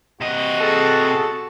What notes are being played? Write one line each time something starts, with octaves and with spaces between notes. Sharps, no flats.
C3 F#4 D#5
G#4 A4 A5